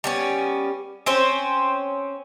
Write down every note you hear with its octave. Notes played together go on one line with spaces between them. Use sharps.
G3 B3 C#4
C4 C#4 C5